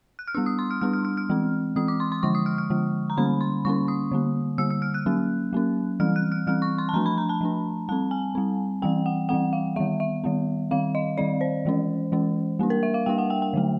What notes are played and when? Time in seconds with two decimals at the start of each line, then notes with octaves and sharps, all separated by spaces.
0.19 F#6
0.28 F6
0.35 G3 B3 D4 E6
0.46 D#6
0.59 C6
0.71 F6
0.81 G3 B3 D4 F6
0.93 F6
1.05 F6
1.17 F6
1.29 E3 G#3 C4
1.76 E3 G#3 C4 D#6
1.88 D6
2.00 C6
2.12 C6
2.23 D3 F3 G#3 C#6
2.35 D#6
2.46 F6
2.58 F6
2.70 D3 F3 G#3
3.10 A#5
3.17 D3 G3 A#3 C#4 B5
3.41 C6
3.65 D3 G3 A#3 C#4 C#6
3.88 D#6
4.11 D3 G3 A#3
4.58 D3 G3 A#3 E6
4.70 E6
4.82 F6
4.94 F#6
5.06 F#3 A#3 C#4
5.53 F#3 A#3 C#4
6.00 E3 G3 C4 F6
6.16 F#6
6.32 F6
6.47 E3 G3 C4 F6
6.62 C#6
6.78 C6
6.89 A5
6.94 F3 A3 D4 A#5
7.06 B5
7.18 A#5
7.29 A5
7.41 F3 A3 D4
7.89 G3 C4 A5
8.11 G#5
8.35 G3 C4
8.82 E3 G3 C4 G5
9.06 F#5
9.29 E3 G3 C4 F#5
9.53 F5
9.76 D#3 G3 B3 E5
10.00 E5
10.24 D#3 G3 B3
10.71 D#3 G3 C4 F5
10.95 D#5
11.18 D#3 G3 C4 D5
11.41 C5
11.65 E3 G#3 C#4
12.12 E3 G#3 C#4
12.59 G3 A#3 D4
12.70 A#4
12.83 E5
12.94 F5
13.06 G3 A#3 D4 G5
13.18 F#5
13.30 G5
13.42 G5
13.53 D3 F#3 A3